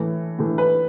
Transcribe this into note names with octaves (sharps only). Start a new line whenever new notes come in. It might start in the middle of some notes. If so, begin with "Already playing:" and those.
Already playing: A2 E3 A3
A2 E3 A3
B4